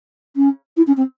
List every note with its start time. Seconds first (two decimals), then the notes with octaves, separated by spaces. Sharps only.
0.36 C#4
0.77 E4
0.87 C#4
0.97 C4